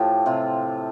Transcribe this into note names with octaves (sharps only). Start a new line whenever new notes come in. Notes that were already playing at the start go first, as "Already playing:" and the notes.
Already playing: A2 F3 G4 A4
C3 F4